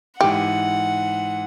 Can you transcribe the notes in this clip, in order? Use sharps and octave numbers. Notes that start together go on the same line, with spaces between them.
G#2 E3 G4 F#5